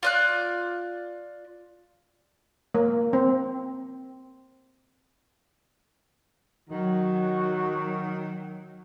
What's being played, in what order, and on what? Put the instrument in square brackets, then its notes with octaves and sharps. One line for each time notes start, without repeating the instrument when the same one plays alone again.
[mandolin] F4 D5 F#6
[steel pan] A#3
C4
[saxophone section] D#3 [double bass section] F#3 [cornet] F#4